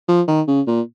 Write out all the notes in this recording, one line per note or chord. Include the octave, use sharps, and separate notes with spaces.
F3
D#3
C#3
A#2